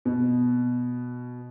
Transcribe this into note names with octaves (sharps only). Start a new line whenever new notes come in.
B2